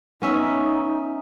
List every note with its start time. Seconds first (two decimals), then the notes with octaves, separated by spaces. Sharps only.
0.22 B3 C#4 D#4 E5